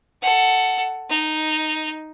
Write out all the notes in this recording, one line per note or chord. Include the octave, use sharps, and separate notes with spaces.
A4 F#5
D#4